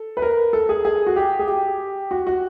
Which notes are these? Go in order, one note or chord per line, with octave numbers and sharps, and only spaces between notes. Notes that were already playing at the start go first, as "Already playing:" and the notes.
Already playing: A4
B4
A#4
A4
G#4
G#4
F#4
G4
G#4
G4
F#4
F#4